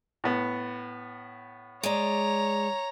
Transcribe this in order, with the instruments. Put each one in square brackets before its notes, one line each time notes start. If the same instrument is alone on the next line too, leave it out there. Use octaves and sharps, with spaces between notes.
[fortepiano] A2 B3
[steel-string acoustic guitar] G#3 D5 [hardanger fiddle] C#5 A#5